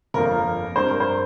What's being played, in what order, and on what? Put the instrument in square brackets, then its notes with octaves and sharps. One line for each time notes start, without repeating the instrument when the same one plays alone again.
[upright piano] G1 F2 F3 A#3 A#4
G2 G3 C4 C5
A#4
C5